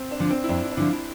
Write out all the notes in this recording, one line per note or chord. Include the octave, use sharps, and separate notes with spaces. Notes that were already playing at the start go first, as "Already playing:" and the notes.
Already playing: C4
D4
D3 F3
C4
E4
F2 D4
E4
D4
D3 F3 E4
E4